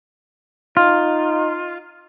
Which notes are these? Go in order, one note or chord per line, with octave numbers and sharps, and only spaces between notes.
D#4 F4